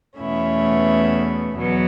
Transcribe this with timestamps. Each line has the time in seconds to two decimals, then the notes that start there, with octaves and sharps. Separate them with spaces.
0.18 E2 B2 A3 C#4 E4
1.56 E2 B2 F#3